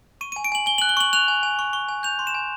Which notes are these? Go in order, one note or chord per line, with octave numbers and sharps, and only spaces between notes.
C#6 D#7
G#5 D#7
D7
G#5 F#7
G#5 G7
F#6 F#7
G7
C#6 F#7
F#6 F7
G#5
G#5
C#6
C#6
G#5
G6 F7
C6
E7
G#5